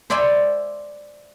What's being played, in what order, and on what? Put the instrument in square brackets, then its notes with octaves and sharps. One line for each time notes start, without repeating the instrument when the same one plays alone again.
[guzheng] C5 D5 E5 G#5 B5 C6